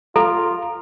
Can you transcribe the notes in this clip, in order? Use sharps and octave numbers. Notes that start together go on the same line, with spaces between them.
F4 A4 A#5